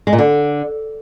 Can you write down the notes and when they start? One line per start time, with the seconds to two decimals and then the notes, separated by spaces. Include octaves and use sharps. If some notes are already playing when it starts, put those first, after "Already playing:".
0.07 G#3
0.13 A#2
0.18 D3